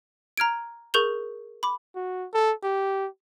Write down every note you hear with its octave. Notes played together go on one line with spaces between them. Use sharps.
A#5 F6 G#6 D7
G#4 A#4 C#6 G6 F7 G7
B5 D6
F#4
A4
G4